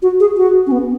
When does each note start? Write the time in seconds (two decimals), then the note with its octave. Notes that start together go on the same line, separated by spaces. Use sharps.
0.02 F#4
0.20 G#4
0.37 F#4
0.67 C#4
0.72 B3